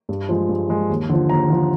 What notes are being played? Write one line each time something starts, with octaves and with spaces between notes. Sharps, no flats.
G2
F3 G#3
G2
F3 G#3
D#2
D3 F3
D#2 A#5
D3 F3